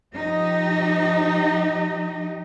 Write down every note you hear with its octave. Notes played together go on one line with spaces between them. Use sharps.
F3 D#4 G4 D#5